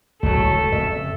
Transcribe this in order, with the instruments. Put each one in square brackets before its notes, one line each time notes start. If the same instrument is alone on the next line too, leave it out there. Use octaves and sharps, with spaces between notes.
[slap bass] D1 C#2 [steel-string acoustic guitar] F#3 A3 [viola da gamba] A4
[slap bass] F2 C#3 [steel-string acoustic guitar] E5